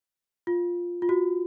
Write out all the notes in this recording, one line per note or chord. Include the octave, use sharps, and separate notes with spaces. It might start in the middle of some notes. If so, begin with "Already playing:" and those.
F4
F4
F#4